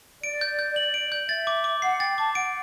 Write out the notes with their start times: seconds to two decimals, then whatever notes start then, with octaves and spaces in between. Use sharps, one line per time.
0.23 D5 D7
0.41 G6
0.59 G6
0.76 F#7
0.94 D7
1.12 G6
1.29 E5 A6
1.47 D6
1.64 D6
1.82 F#5 C7
2.00 G5 A6
2.18 A5 D6
2.35 F#5 D7